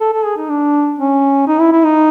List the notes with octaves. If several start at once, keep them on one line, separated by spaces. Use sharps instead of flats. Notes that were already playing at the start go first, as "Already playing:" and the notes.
A4
A4
G#4
D#4
D4
C#4
D#4
E4
E4
D#4